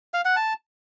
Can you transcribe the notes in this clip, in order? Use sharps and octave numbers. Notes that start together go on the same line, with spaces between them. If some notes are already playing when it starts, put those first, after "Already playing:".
F5
F#5
A5